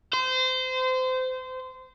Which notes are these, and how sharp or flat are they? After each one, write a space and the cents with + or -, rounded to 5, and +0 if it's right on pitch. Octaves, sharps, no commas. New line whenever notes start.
C5 -25